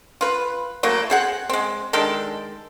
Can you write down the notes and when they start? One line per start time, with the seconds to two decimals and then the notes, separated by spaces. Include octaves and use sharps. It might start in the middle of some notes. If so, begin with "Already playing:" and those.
0.21 F4 B4
0.83 F#3 A3 A#3 E4
1.10 C4 G#4 F#5
1.50 G#3 C4
1.93 D#3 G#3 D4 A4